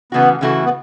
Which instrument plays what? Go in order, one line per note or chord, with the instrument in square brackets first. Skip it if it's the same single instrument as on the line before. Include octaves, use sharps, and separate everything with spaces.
[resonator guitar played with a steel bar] C#3 E3 A3 F#4 [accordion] B3
[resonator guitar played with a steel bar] C#3 E3 A3 F#4
[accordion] B3